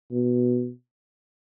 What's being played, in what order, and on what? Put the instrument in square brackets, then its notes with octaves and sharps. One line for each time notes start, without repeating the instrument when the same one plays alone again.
[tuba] B2